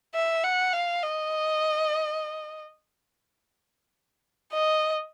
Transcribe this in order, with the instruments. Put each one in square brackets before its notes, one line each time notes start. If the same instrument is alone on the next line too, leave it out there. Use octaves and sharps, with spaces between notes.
[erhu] E5
F#5
F5
D#5
D#5